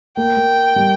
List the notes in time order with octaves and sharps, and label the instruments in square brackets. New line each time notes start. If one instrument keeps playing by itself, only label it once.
[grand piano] A#3 [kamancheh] G5
[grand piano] A#3
G3